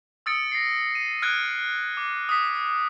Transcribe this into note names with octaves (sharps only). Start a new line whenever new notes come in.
D#6 E6 A6 C#7 D7
A#6 C7
D#7
F6 F#6 G#6 D7
D6
D#6 B6